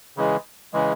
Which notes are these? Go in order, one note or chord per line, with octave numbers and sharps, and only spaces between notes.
C#3 E3 G#3
C#3 E3 G#3